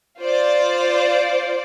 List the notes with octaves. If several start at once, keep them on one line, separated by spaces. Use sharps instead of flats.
F4 C5 D5